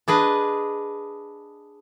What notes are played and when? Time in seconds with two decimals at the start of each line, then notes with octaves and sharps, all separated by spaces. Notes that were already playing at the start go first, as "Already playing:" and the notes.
0.08 D4 G#4 B4 D#5